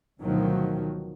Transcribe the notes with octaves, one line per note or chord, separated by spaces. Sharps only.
D2 B2 D#3 F3 F#3